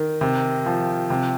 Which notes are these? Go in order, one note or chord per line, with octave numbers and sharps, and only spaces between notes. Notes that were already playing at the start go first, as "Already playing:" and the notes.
Already playing: D#3
C3
F3
C3